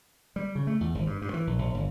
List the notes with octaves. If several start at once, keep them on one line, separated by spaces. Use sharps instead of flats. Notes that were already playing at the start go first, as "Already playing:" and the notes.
G3
C#3
A3
E2
G#1
G2
G2
E3
A#1
A#1
G1